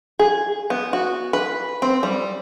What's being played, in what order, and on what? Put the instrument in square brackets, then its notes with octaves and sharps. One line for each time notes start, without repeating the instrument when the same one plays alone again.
[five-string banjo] G#4
B3
F#4
B4
C4
G3